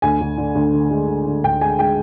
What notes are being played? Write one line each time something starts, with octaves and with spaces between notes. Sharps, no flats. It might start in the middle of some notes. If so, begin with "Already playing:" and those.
D2 G#5
D2
D3
D2
D3
G#3
D3
D3
D2 G5
G#3 G#5
G#3 G5